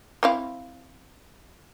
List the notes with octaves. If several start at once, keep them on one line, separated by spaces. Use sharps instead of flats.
C4 E4 F5